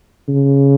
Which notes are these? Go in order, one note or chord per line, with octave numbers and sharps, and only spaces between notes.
C#3